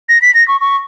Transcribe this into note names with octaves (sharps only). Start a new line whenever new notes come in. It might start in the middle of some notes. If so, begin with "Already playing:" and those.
A#6
B6
A#6
C#6
C#6